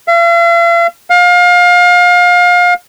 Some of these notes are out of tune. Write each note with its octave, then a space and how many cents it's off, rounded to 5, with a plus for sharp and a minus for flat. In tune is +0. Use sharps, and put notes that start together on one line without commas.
F5 -45
F5 +30